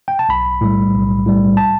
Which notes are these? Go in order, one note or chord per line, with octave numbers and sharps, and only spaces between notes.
G5
A5
B1 B5
A2 G3
B1
A2 G3
A5